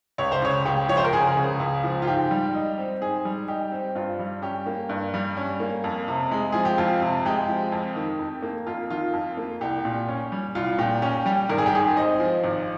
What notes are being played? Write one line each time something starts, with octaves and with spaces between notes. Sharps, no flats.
C#2 C#5
C5
C#3 C#5
C#2 G4
F3 C#5
C5
A#4
C#2 G#4
C#3
C#2
F3
F4
G#2 G4
G3
D#4
C4
G#2 G#4
G3
D#4 G4
C4
G2 F4
G3
C#4 G4
A#3
G2
G3
C#4
A#3
F2
C3
G#3
F3 G#4
G4
F2 F4
C3
G#3 G4
F3
F2
D#3
F2
A#3
F2 F4
D#3 F4
F2
A#3
C2 G4
A#2
C#4
G3
C2 F4
A#2 G4
C#4 G4
G3 G4
G#1 A#4
G#4
G4
G#2 G#4
C4 D#5
F3
G#1